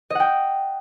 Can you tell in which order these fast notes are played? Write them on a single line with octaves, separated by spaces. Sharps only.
D#5 F#5 G5